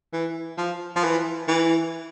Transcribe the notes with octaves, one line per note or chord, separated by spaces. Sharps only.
E3
F3
F3
E3
E3